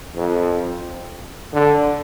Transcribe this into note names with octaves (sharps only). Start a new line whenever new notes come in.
F2
D3